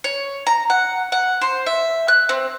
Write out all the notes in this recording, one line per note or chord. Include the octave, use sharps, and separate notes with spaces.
C#5
A#5
F#5
F#5
C5
E5
F#6
C4